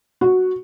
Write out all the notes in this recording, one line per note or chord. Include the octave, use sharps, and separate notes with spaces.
F#4